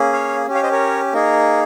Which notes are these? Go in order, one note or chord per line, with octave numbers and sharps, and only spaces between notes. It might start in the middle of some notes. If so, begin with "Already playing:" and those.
Already playing: A#3 C#4 G#4
C#5 F5
C#4 G4
C#5 F5
C5 D#5
A#4 C#5
A#3 D#4 G#4 A#4